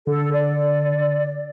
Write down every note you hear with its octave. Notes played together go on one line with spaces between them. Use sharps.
D3 A4
D5